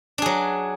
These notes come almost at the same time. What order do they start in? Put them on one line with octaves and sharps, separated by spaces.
D4 G#4 F#3